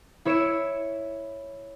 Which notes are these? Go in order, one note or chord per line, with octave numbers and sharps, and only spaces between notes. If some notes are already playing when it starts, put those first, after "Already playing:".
E4 C#5 E6 C#7 D7 E7